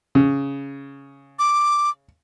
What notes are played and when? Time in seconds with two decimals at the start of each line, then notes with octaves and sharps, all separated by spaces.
0.15 C#3
1.39 D6